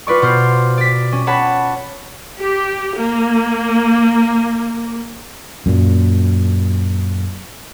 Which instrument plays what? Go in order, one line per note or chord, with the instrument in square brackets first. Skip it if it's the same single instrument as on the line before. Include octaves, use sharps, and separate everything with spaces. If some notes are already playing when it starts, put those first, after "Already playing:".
[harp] F4 B4 D5 C#6
B2 C5 F6
D5 B6
C#4
C#5 F#5 A5 B5
[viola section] G4
A#3
[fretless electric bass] F#2 A#2